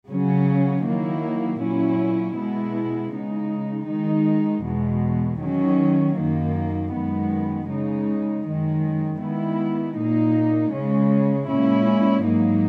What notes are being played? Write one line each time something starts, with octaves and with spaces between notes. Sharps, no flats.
C#3 F#3 C#4
D#3 F#3 A#3 E4
A#2 F#3 C#4 E4
B2 G#3 B3 E4
C#3 G#3 D#4
D#3 G#3 D#4
E2 B2 G#3
D#3 F#3 C#4
F#2 D#3 A#3
F#2 D#3 G#3 B3
C#3 G#3 D#4
F#2 D#3 G#3
D#3 G#3 B3 E4
A#2 A#3 D#4
C#3 G#3 C#4
A#2 G#3 C#4 E4
G#2 F#3 A#3 D#4